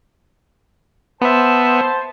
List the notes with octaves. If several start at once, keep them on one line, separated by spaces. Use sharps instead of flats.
B3 C5 E5 A5